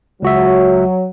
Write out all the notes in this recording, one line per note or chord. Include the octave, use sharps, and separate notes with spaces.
C#2 F#3 F#4 E5